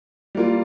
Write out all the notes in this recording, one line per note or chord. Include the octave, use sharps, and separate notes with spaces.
G3 A#3 F4